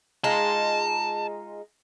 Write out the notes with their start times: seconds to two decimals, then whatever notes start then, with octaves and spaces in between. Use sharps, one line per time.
0.24 G#3 D#4 F4 A5